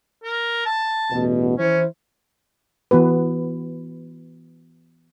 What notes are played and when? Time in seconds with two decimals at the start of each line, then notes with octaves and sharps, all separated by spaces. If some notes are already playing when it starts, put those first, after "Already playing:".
0.23 A#4
0.66 A5
1.12 A1 E2 B2
1.58 E3 C#4 E4 C5
2.91 E3 B3 F#4 B4